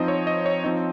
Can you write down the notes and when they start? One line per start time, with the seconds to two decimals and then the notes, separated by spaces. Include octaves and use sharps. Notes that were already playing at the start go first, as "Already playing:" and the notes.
Already playing: F3 C4 D#4 D#5
0.08 C#5
0.27 D#5
0.46 C#5
0.64 F3 C4 D#4 D#5